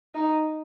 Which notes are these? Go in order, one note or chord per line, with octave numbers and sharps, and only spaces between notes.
D#4